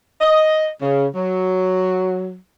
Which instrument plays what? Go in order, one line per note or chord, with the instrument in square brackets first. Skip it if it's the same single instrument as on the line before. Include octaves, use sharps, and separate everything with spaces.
[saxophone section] D#5
C#3
F#3